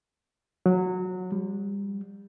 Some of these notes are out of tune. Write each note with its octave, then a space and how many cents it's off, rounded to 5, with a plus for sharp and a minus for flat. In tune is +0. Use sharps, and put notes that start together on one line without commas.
F#3 -15
G3 +30